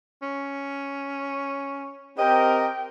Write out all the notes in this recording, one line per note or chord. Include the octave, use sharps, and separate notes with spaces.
C#4
C4 G4 A#4 D#5 G5